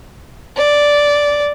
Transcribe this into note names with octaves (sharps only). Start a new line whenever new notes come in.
D5